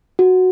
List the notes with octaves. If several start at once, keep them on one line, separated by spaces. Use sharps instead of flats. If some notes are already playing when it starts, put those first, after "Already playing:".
F#4